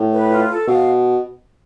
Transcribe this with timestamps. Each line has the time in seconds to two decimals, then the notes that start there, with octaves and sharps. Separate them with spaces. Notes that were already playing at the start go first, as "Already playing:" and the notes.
Already playing: A2
0.12 B4
0.31 F4
0.49 A4
0.67 B2 F5